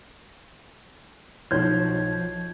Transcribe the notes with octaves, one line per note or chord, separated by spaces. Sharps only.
B1 F3 C#5 G6 G#6